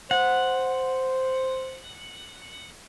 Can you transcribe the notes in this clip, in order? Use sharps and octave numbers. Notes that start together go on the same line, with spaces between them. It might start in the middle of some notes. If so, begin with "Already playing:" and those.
C5 F#5